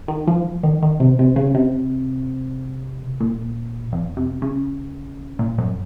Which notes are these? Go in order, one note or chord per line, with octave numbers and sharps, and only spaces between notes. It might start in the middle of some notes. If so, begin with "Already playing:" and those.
D#3
F3
D#3
D#3
C3
C3
C#3
C3
A#2
F2
C3
C#3
A#2
F#2